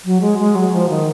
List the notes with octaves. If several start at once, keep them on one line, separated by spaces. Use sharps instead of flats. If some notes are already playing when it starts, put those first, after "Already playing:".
F#3
G#3
G#3
F#3
F3
D#3